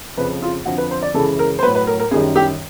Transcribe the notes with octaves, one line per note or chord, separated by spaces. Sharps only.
F2 C#3 F3 B4
F4
F2 D3 F3 F#4
B4
C5
D5
F#2 C#3 E3 G#3 A4
A#4
C5
A2 F#3 B4
B4
A#4
A#4
F#2 D#3 G3 G#4
G4